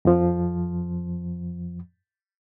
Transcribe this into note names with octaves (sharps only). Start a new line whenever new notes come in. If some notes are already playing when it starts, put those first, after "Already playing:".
F2 F3